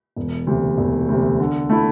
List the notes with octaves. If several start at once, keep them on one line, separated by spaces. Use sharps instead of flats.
E1
D2 C3
E1
D2 C3
D3
A3 E4